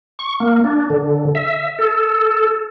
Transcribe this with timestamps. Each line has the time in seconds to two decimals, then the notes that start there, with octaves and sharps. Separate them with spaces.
0.19 C#6
0.40 A#3
0.64 D4
0.90 D3
1.35 E5
1.79 A4